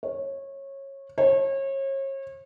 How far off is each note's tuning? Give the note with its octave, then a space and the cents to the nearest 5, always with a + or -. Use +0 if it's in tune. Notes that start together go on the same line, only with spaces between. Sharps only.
C#5 -20
C#5 -35